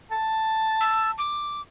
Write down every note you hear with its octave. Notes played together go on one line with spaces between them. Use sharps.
A5
E6
D6